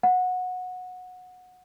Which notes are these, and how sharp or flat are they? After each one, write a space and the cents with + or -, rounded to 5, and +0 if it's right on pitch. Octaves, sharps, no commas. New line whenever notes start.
F#5 -15